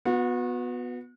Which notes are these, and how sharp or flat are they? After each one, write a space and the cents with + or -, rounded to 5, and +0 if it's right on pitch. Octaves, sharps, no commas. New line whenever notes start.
B3 +0 F#4 -35